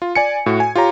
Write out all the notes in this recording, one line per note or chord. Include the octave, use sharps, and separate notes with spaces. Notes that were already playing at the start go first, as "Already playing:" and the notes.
F4
D5 G#5 C#7
A2 F#4
G#5
F4 G4 C#5 A#5